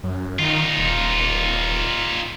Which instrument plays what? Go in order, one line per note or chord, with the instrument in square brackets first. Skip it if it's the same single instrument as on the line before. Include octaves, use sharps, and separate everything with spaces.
[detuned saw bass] F#2
[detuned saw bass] D#3 [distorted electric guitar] D#4 F4
[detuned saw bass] D#1